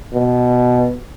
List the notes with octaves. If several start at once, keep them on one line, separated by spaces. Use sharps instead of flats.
B2